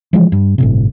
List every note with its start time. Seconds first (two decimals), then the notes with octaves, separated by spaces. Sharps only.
0.13 E3 F3 G#3
0.32 G2
0.58 G1 A2 C3